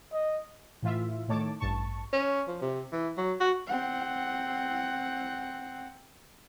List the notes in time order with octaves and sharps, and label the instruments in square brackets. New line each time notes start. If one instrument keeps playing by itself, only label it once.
[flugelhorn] D#5
[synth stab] A2 E3 F4 E5
A2 D#3 A3 C#5 A5 D6
A1 G2 A5 C#6
[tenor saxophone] C#4
F3
C3
E3
F#3
F#4
[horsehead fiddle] C4 F#5